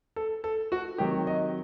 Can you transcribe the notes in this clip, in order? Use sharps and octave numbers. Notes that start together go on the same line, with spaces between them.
A4
A4
F#4
C3 D#3 F#3 G4
D#5